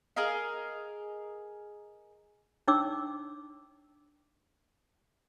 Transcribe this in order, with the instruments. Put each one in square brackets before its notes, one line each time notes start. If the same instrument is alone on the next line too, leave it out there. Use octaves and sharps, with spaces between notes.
[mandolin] G#4 A#4 D#5 F5
[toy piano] D4 D#4 C#5 G5 D6 E6